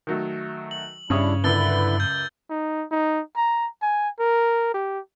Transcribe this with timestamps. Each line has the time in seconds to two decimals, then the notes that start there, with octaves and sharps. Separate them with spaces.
0.07 D#3 F#3 A3
0.71 F#7
1.10 G2 C#3 G3 D4 E4 C#5 D#6
1.44 C#2 F#2 D3 E4 B4 E6 A6 G7
2.00 G6
2.50 D#4
2.91 D#4
3.36 A#5
3.82 G#5
4.19 A#4
4.74 G4